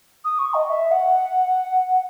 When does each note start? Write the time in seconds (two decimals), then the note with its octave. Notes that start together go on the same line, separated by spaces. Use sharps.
0.24 D#6
0.39 C#6
0.54 D#5
0.69 E5
0.91 F#5